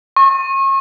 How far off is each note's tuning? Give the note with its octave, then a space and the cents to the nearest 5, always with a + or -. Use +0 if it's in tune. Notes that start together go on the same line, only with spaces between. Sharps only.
C#6 -35